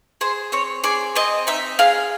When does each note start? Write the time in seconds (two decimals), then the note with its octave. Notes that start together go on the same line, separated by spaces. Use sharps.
0.21 G#4 C5
0.52 C4 C#5
0.84 G#4 D5
1.15 C4 D#5
1.47 D#4 E5
1.79 G#4 F5